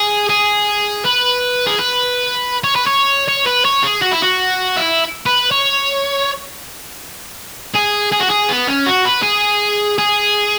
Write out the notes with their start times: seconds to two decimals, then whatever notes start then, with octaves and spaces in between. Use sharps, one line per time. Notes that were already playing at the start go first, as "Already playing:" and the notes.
Already playing: G#4
0.29 G#4
1.05 B4
1.67 G#4
1.78 B4
2.64 C#5
2.76 B4
2.87 C#5
3.28 C#5
3.46 B4
3.65 C#5
3.84 G#4
4.02 F#4
4.12 E4
4.22 F#4
4.76 E4
5.26 B4
5.51 C#5
7.74 G#4
8.12 G#4
8.20 F#4
8.29 G#4
8.49 B3
8.68 C#4
8.86 F#4
9.05 B4
9.23 G#4
9.98 G#4